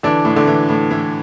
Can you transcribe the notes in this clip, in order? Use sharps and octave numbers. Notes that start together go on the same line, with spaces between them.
D3 E3 D4
A2
D3 D4
E3
A2
E3